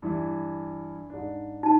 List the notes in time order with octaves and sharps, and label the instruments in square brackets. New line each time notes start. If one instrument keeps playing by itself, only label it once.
[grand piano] G2 E3 E4
G#2 D4
[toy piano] D#4 A5